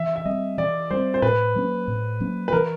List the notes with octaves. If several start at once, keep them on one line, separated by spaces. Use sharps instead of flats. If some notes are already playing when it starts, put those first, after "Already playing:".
Already playing: E3 E5
E5
G3 C4 D#5
E3 D5
G3 C4 C5
C5
A2 B4
F#3 A#3 C#4
A2
F#3 A#3 C#4
B4
E3 A#4